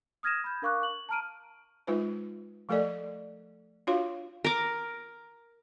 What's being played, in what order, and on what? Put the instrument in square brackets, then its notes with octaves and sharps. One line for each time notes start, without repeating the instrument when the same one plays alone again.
[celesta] D#6 F6 G#6 A#6 D#7 E7
B5 G6
D4 A#4 F5 C#6 D6 F#6
F#7
A5 A#5 F6 D7 D#7
[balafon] G#3 D#4 F4 B4 C5
F3 A3 A4 A#4 D5 D#5
D4 F4 F#4 C#5 F5 C6
[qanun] A#4 D6